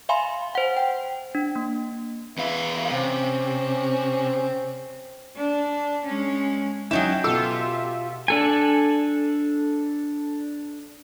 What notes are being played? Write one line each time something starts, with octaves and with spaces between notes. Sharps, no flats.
E5 F5 G#5 B5 C6
C5 F#5
G5
D4
A#3
E2 B4 E5 F5
C3 C4 C#4
D4
G#3 C#4
F#3 C#4 D#4 E4 G5 E7
B2 B3 F4 G4 A4 E5 E6
D4 A4 G#5